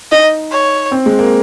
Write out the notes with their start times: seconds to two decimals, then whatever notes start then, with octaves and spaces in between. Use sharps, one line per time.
0.11 D#4 D#5
0.52 C#5
0.92 C4
1.06 G#3
1.19 A#3